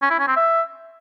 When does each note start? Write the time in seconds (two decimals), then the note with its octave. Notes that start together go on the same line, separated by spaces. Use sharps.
0.02 C#4
0.11 E4
0.19 C#4
0.28 C4
0.36 E5